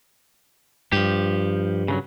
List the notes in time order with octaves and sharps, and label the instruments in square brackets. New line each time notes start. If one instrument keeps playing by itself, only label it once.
[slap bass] G2 [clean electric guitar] F3 G4
[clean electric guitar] C#3 E3 F#3